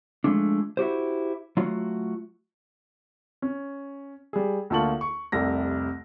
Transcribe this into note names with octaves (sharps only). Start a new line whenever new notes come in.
F3 G#3 A3 D4
E4 F#4 G4 C5
F#3 A3 F4 F#4
C#4
G3 G#4
D2 A#3 F4 A5 C#6 F#7
C#6
F1 C2 C3 A#6